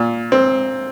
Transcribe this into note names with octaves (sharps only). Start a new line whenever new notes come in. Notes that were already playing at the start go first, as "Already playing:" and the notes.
Already playing: A#2
C4